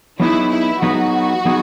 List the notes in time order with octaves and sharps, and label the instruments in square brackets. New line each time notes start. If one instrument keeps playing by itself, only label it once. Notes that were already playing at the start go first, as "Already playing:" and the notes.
[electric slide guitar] F#3 B3 D#4 G#4 B4 [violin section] E4
[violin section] E4
[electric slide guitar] F#3 B3 D#4 G#4 B4 [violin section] F#4
[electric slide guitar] F#3 B3 D#4 G#4